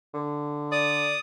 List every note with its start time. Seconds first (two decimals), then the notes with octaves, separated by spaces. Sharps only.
0.14 D3
0.72 D5 D#6